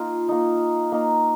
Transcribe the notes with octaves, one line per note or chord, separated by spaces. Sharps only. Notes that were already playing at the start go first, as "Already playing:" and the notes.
Already playing: A#3 D#4 F4
A#3 D#4
A#3 D#4